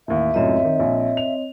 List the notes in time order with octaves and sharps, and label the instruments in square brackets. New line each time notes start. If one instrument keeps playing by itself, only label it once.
[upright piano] A1 D#2 [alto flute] E5
[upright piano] C#2 F#2 A2 [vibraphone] C4 C#5 D#5
[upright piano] D#3
A#1
F7